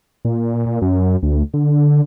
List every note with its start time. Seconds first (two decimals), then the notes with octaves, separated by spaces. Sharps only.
0.25 A#2
0.66 A#2
0.82 F#2
1.23 D2
1.54 D3